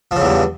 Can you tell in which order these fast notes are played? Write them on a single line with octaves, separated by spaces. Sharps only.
F3 C#3 E2 G2